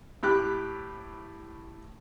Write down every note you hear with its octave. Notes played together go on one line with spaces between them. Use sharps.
A2 G4 B5 F#6